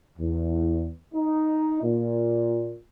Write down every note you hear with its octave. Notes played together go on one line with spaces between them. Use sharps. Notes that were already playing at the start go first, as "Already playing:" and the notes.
E2
D#4
A#2